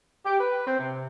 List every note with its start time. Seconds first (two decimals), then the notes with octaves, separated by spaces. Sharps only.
0.24 G4
0.40 B4
0.66 C4
0.79 C3